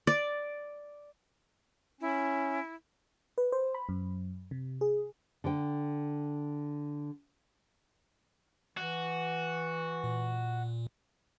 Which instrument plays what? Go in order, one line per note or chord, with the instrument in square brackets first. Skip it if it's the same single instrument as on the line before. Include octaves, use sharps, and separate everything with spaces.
[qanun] D5
[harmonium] C#4 [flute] E4
[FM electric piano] B4
C5
B5
F#2
C3
G#4
[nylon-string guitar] D3 G5
[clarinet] E3 [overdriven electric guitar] F#4
[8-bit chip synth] A#2